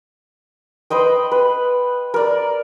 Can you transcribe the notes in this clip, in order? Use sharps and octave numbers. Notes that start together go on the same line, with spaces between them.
B4 C5 D#5 G5
B4
A#4 D5